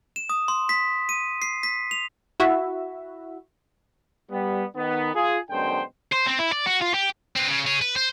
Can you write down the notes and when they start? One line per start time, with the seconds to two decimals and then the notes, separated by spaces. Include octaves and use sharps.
0.16 E7
0.29 D#6
0.48 C6
0.69 B6
1.09 D#7
1.42 C7
1.63 B6
1.91 F7
2.40 E4 F#4 E5
4.31 G3 B3
4.76 D#3 B3
5.15 F4 G#4
5.50 F#2 B2 D3 G#3 C5 G5
6.12 C5
6.27 C4
6.39 E4
6.52 D5
6.66 F#4
6.81 F4
6.94 G4
7.36 C4 B4
7.48 C#3
7.67 G#4 C#5
7.81 B4
7.96 C5